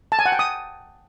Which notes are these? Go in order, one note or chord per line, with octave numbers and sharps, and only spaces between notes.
A5
G#5
F#5
G5
D#6